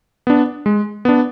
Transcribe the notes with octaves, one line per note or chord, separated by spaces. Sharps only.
B3 D4
G#3
B3 D4